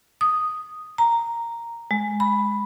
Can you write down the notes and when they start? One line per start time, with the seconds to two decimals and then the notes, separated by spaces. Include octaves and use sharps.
0.21 D#6
0.98 A#5
1.91 G#3
2.20 B5